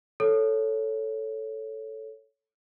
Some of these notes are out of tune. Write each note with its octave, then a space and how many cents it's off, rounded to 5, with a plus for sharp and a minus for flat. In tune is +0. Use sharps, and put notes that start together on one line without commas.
A4 +0 C#5 +0